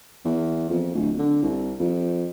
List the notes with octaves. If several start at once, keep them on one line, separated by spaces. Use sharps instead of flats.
E2
F2
D1
D3
C2
F2